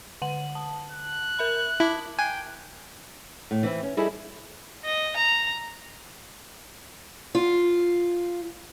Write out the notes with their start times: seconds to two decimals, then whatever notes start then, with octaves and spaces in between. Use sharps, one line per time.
0.22 D3 F#5 F#7
0.55 A5
0.91 F#6
1.39 A#4 E5 B5
1.80 E4 A5 D6
2.19 G5 G#5 F#6
3.51 A2
3.63 E3 C4 E4
3.83 C#4
3.97 G3 D#4 E4 G#4 A4
4.85 D#5
5.16 A#5
7.35 F4